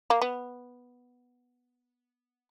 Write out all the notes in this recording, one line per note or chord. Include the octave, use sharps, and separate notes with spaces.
A#3
B3